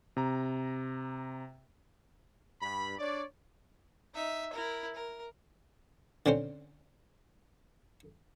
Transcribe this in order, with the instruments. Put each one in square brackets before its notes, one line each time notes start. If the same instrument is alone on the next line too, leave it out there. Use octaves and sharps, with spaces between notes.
[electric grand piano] C3 A#5
[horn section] G2 B5
D4 C#5 D5
[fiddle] D#4 E5
E4 A#4
A#4
[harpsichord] D3 C4 C#4 C5